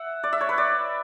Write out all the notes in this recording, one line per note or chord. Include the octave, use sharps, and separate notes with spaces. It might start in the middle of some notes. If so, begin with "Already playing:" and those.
Already playing: E5 F#5
D5
E5
C#5
B4
D5